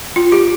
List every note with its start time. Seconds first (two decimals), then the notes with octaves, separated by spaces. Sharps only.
0.16 F4
0.32 G4